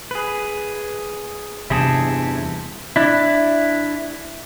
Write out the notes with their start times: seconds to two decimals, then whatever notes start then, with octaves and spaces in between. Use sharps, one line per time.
0.11 G#4 B4
1.70 E2 G2 C3 E4 G#4 A5
2.96 D4 E4